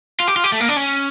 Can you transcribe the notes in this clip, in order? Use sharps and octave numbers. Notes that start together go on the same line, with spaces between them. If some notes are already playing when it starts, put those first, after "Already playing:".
F4
G4
F4
G4
A3
A#3
D4
C#4